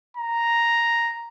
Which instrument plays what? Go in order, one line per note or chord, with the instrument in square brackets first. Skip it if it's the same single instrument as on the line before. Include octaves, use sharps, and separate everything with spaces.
[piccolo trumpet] A#5